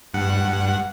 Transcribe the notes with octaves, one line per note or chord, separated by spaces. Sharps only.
G2 F#5